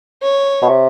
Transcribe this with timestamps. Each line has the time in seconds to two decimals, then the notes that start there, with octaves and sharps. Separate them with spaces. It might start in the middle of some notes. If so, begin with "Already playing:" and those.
0.22 C#5
0.62 B2
0.69 C3